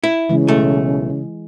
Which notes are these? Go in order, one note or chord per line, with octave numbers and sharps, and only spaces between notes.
E4
C#3 E3 G#3
B1 A3